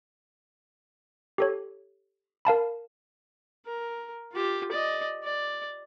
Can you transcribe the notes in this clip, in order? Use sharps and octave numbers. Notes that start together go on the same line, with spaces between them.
G4 A4 C#5
A#4 F5 A5 B5
A#4
F4 G4
D5 D#5
D5